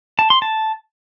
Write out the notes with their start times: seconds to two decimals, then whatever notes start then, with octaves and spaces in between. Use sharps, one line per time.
0.19 A5
0.30 C6
0.42 A5